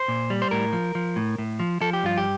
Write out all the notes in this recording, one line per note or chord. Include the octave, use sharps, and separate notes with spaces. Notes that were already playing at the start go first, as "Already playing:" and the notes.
Already playing: C5
A#2
G3
C5
A2 A#4
F3
F3
A2
A2
F3
F3 A4
G4
G2 F4
G4